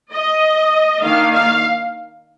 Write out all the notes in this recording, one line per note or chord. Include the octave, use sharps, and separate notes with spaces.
D#5
D#3 A#3 D4 F5
F5